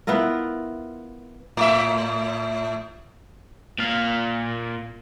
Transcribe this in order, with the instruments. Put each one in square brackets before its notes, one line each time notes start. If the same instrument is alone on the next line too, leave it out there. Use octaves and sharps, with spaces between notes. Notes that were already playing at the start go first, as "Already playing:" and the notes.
[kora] B3 E4 F4 A#4
[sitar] A2 E5
[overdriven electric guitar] A#2 F5